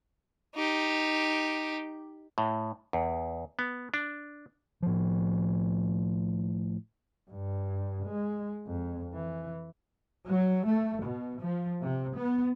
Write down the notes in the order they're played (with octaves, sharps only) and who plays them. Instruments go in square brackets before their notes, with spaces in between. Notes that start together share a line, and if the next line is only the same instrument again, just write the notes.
[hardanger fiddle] D#4 G4
[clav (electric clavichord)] A2
E2
B3
D4
[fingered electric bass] A2 F3
[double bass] G2
G#3
F2
E3
[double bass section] F#3
A3
B2
F3
C3
B3